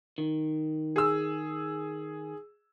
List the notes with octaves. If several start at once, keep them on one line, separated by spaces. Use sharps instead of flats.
D#3
G#4 E6